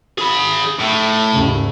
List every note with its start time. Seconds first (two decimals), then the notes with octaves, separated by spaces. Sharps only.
0.18 G#4 B5
0.79 A2
1.34 D#2 G#2 C#3